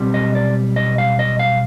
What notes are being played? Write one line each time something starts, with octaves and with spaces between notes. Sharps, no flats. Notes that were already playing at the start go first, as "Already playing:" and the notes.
Already playing: B1 B2 G3 C4
D#5
D5
D#5
F5
D#5
F5